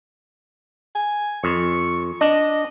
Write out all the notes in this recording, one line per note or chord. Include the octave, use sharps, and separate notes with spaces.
G#5
F2 C#6
D4 D#5